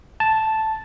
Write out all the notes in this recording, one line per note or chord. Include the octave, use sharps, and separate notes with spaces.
A5